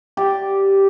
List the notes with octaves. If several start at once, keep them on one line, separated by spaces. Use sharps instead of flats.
G4 D5